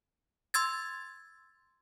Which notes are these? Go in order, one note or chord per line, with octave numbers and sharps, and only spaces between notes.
C6 E6 G#6 A6